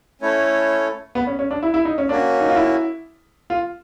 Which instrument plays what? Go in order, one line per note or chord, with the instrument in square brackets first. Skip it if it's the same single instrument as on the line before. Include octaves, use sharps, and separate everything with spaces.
[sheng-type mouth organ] A3 C#4 E4 A4 C#5
[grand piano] B3
C#4
C#4
D4
E4
E4
D#4
C#4
[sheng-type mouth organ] A#3 C#4 F#4 [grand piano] D4
[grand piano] D#4
F4
E4
F4